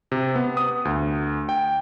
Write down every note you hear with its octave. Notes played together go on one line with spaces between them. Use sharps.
C3
B3
D#6
D2
G5